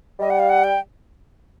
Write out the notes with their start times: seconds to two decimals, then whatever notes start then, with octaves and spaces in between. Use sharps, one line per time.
0.20 G3 D#5
0.30 F#5
0.39 F5
0.49 F#5
0.64 G5